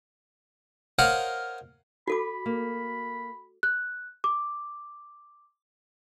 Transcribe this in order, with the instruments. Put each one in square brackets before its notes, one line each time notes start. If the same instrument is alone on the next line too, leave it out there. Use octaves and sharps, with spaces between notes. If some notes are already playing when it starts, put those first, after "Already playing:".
[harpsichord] A#4 C5 C#5 D#5 F5 F#5
[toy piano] F#4 A4 D6 [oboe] B5
[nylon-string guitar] A#3
[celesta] F#6
D6